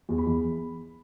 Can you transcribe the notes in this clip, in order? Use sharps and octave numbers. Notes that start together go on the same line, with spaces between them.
E2
B5
E2